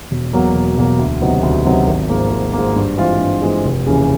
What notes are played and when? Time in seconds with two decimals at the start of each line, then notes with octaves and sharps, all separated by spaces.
0.11 E1
0.33 E2 B2 F#3 A#3
0.55 E1
0.77 E2 B2 F#3 A#3
0.99 D2
1.22 C3 D#3 F#3 B3
1.43 D2
1.65 C3 D#3 F#3 B3
1.87 G#1
2.09 G#2 F3 A#3
2.31 G#1
2.53 G#2 F3 A#3
2.76 G2
2.97 E3 G#3 C4 F4
3.19 G2
3.42 E3 G#3 C4 F4
3.65 F1
3.86 D#2 C#3 E3